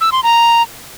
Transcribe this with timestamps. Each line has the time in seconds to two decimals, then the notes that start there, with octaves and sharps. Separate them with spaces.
0.01 E6
0.12 C6
0.23 A#5